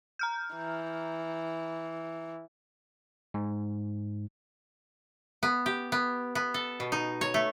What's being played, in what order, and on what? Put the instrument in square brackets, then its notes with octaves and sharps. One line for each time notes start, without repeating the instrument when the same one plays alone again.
[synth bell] A#5 F6 G6
[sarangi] E3
[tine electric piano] G#2
[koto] B3
G4
B3
B3
A4
B2
D#4
C#5
A3